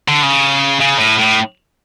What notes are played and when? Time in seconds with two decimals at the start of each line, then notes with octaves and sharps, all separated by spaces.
0.08 D3
0.23 C#3
0.81 C#3
0.99 A2
1.19 A2